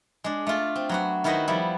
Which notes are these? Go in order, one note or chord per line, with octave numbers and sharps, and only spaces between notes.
G#3 D4
A3 F4
C4
F#3 B3 F#4
D#3 E4 F#4 B4 C5 D#5
F3 G3 B3 E4